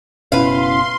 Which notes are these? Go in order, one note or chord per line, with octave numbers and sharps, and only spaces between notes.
F#1 B2 C#4 E4 B4 F5 C6